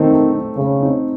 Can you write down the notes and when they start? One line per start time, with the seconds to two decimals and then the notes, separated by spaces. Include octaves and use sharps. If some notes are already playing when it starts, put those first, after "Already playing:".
Already playing: D#3 A3 C4 D#4
0.11 A3
0.33 C4 D#4
0.57 C#3 A3
0.81 C4 D#4